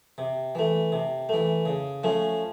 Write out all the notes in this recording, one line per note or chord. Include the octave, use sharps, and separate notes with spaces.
C3
E3 A3
C3
E3 A3
C#3
F3 A3 C#4